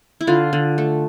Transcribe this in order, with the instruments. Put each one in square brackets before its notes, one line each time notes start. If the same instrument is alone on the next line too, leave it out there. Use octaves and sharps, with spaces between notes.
[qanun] E4
D3 F4
D3
A3